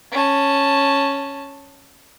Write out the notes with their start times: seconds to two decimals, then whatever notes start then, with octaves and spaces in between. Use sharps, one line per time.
0.12 C#4 A5